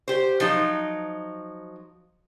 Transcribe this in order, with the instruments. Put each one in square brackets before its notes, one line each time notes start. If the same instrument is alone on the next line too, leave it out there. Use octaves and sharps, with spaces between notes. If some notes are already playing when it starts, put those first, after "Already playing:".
[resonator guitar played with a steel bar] G4 C5
F3 F#3 D#4